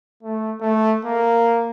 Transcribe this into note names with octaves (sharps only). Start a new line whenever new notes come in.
A3
A3
A#3